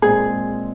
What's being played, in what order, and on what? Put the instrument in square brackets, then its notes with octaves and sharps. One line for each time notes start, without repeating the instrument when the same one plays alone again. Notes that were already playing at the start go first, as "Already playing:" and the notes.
[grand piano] A#2 G#3 C4 [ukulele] G#4